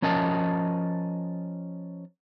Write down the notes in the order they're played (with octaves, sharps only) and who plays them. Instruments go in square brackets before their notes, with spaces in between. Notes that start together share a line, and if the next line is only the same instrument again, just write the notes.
[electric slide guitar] F3 C#4 A#4 D#5 A5